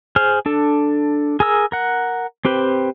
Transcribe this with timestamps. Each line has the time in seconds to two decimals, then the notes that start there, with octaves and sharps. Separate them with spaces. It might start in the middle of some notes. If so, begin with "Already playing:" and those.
0.16 G#4 C5 F6
0.46 D4 A4
1.40 G#4 A#4 E6
1.72 A#4 F#5
2.45 C4 G4 B4 C5